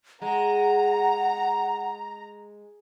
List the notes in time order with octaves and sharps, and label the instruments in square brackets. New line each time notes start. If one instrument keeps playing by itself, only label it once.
[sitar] G#3 [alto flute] F#5 [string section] A#5